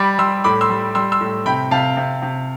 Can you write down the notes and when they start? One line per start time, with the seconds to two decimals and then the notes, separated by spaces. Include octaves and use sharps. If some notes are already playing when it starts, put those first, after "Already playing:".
Already playing: G3 B5 D6
0.19 G3 C6 E6
0.44 A2 B5 D6
0.61 C6 E6
0.70 G3
0.95 G3 C6 E6
1.12 C6 E6
1.21 A2
1.46 C3 G5 B5
1.71 C3 F5 A5
1.97 C3
2.22 C3